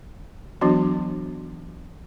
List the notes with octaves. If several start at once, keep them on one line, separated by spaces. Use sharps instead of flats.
E3 F#3 B3 D4 F#4